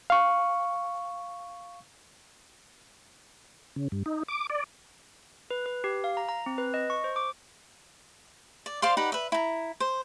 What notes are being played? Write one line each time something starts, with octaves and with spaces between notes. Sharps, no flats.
F5 C#6
C#3
G2
D#4
D6
D5
B4
B4
G4
F5
A#5
A#5
C4
B4
D#5
C#6
C5
D6
D5
C5 D5 F5 C6
D#4 G4 B4 F#5
B4 E5
E4 A#5
C5